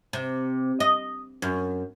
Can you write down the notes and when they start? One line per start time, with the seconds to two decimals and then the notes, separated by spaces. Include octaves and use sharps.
0.13 C3
0.80 D#5
1.42 F#2